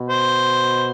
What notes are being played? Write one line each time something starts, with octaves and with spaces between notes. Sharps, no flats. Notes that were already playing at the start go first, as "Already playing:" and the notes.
Already playing: B2
C5